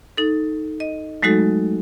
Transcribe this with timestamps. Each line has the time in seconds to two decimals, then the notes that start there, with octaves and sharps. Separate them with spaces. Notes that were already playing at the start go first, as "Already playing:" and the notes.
0.17 D#4 A4
0.80 D#5
1.23 F#3 G#3 A3 D#4 F#4 A4